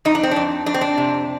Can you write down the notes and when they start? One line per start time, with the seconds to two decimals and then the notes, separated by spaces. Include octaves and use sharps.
0.05 F2 D#4
0.15 D4
0.23 C4
0.31 F2 D4
0.66 F2 D4
0.74 C4
0.81 D4
0.98 C3